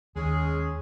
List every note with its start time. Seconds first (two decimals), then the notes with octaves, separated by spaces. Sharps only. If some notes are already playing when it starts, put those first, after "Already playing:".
0.16 D#2 G#3 C#4 G#4